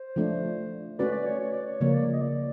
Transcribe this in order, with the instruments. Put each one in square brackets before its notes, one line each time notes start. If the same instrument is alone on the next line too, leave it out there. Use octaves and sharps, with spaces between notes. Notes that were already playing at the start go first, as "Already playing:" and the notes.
Already playing: [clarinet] C5
[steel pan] F3 A3 D4
[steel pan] A3 C#4 F#4 B4 [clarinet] D5
[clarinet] D5
C#5
C#5
D5
C#5
[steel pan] C#3 F3 A#3 [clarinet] C#5
[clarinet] D5
D#5
D5